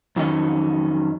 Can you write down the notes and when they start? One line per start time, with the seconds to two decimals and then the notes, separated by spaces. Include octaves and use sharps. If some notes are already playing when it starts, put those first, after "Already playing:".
0.16 F2 D#3 F#3 C#4 D#5